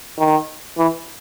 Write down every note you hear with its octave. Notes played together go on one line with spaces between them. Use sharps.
D#3
E3